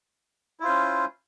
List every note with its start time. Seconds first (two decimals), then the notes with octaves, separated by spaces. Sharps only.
0.60 E4
0.63 F4
0.65 C5
0.68 C#4